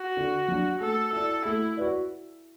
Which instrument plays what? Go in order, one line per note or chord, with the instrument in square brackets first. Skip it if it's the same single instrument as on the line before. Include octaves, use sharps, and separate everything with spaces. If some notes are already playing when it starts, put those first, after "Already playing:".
Already playing: [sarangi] F#4
[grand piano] D3
F#3 D4
[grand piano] A3 [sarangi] A4
[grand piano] E4 D5 [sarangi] A4
[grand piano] A3 [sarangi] E4
[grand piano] F#4 B4 D5